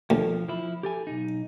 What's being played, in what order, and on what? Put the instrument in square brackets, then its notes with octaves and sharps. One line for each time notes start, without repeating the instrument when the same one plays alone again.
[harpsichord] D2 [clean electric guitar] F3
[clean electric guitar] F3 E4
G4 A4 G#5
B1 F2 D#4